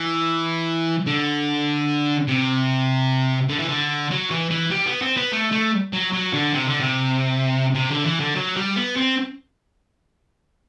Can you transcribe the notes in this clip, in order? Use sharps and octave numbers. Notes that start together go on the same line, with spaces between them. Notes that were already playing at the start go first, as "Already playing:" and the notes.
Already playing: E3
D3
C3
D3
E3
D3
F#3
E3
E3
G3
B3
C4
B3
A3
A3
F#3
F#3
D3
C3
D3
C3
C3
D3
E3
D3
F#3
G3
B3
C4